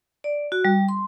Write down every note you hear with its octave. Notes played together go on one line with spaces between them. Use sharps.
D5
F#4
G3
C6